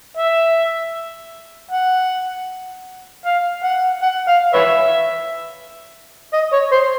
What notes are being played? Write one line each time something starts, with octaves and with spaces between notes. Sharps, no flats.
E5
F#5
F5
F#5
F#5
F5
B4 C#5 E5
D#5
C#5
C5